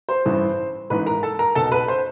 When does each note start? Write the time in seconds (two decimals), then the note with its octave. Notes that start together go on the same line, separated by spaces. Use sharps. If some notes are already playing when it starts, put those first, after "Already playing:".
0.09 C5 C6
0.25 A1 G2 E3
0.90 A1 G#2 E3 B4 B5
1.06 A#4 A#5
1.23 A4 A5
1.39 A#4 A#5
1.55 B1 B2 A4 A5
1.72 B4 B5
1.88 C5 C6